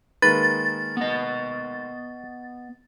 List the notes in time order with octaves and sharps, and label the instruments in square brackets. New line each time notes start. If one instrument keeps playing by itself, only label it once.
[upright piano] D#3 G#3 A#3 [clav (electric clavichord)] B4 [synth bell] A6
[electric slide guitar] B3 D#5